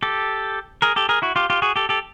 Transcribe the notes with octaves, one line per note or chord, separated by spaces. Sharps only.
G4 A4
G#4 A#4
G4 A4
G#4 A#4
E4 F#4
F4 G4
F4 G4
F#4 G#4
G4 A4
G4 A4